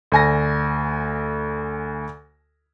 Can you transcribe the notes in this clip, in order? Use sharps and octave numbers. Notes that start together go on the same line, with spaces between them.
D2 G#5 A#6